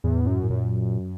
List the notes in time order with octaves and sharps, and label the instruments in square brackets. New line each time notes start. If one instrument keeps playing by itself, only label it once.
[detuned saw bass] E2 [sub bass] A2
[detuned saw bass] F#2
[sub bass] A2
[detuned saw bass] F#2 [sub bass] A#2